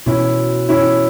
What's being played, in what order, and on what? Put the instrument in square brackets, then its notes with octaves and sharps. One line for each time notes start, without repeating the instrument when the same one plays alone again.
[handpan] B2 [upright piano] E3 C#4 E4
[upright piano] E3 C#4 E4